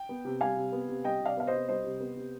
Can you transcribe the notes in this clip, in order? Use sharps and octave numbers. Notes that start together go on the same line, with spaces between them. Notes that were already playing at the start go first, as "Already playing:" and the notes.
Already playing: G5
B3
C3
G3 F5 G#5
C3
B3
C3
G3 D#5 G5
C3
D5 F5
B3 F5
C5 D#5
C3
G3 C5 D#5
C3
B3
C3